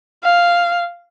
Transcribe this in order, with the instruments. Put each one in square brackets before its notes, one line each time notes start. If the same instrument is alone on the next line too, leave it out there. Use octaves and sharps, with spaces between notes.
[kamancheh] F5